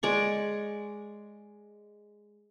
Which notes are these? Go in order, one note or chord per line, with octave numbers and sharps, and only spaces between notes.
G#3 D5 C#6